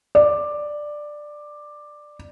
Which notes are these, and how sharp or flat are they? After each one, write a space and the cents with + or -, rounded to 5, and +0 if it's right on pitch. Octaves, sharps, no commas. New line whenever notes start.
D5 +10